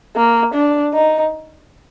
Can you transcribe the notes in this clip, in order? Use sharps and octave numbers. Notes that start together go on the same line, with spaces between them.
A#3
D4
D#4